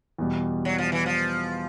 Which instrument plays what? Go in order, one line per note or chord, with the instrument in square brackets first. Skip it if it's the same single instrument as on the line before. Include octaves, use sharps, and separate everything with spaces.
[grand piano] E2 B2 G3
[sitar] F#3
F3
E3
F3